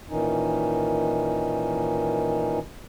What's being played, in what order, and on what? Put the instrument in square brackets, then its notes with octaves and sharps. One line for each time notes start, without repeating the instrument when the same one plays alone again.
[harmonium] A#2 D#3 E3 C#4 D#4